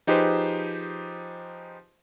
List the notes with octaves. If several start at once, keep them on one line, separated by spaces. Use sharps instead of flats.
F3 D#4 G4 G#4 B4 C5